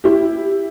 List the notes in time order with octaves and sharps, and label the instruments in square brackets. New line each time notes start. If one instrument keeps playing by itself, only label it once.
[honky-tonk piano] E4 G4